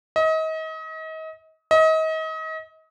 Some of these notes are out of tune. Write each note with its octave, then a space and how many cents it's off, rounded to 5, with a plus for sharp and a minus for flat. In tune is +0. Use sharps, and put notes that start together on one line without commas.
D#5 +35
D#5 +35